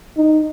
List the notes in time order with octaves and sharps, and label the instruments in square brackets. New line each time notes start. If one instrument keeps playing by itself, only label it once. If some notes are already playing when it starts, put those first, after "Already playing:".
[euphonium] D#4